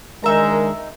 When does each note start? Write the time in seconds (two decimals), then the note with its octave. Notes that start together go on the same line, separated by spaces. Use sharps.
0.24 D#3 G#3 D4 D#4 A#4 E5 A#5